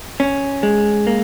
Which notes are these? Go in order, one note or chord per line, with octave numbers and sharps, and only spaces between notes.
C#4
G#3
A#3